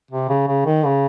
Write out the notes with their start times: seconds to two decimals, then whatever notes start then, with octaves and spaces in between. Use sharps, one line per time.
0.11 C3
0.29 C#3
0.47 C#3
0.66 D#3
0.85 C#3